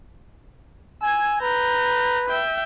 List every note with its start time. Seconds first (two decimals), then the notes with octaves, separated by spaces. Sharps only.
1.02 G#5 E6 G#6
1.41 B4 A#5 G6
2.29 E5 G5